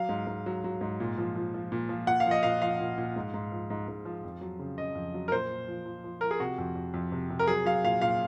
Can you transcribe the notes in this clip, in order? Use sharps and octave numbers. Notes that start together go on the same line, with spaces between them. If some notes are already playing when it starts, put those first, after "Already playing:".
Already playing: F#3 F5
G#2
G#2
F#3
F#3
G#2
A#2
F3
F3
F3
A#2
F3
A#2 F#5
F5
F3
D#5
A#2 F5
F3 F5
A#2
A#2
G#2
G#2
F3
G#2
G#2
F3
F2
F#3
C#3
C#3 D#5
F2
F#3
A#4
A#2 C5
A#2
F3
F3
F3
F3 A#4
G#4
C3 F#4
F2
F2
F2
C3
C3
A#4
F#3 G#4
F#3 F5
A#2 F5
A#2 F5